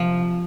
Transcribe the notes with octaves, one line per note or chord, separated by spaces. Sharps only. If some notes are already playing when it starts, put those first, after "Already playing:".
Already playing: C3 F3